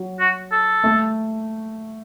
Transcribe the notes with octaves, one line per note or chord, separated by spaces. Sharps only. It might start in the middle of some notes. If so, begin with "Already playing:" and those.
Already playing: F#3
F#4
A4
A3